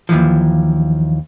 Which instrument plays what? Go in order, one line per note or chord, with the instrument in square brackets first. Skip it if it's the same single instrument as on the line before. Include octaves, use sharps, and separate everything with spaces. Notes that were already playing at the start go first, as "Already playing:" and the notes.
[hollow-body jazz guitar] D#2 E3 F3